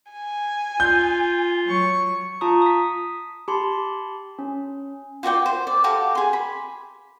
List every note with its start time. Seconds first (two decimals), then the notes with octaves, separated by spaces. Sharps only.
0.12 G#5
0.80 F4 G6
1.64 F#3 C#6
2.41 F4 A5 A#5 C#6 D#6
2.62 D#6 B6
3.48 G4 A5 B5 C6
4.39 C#4
5.23 F4 F#4 D5 G5
5.46 C5
5.67 D5
5.84 F#4 G4 A4 F5
6.15 G#4 C6
6.33 B5